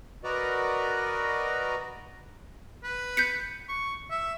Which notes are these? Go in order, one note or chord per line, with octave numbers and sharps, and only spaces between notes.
F#4 A#4 B4 D5 D#5 A#5
B4
G6 B6 C#7
C#6
E5